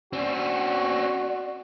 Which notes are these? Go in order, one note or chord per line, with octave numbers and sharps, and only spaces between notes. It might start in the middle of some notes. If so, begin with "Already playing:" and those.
C4 C#4 F#4 D5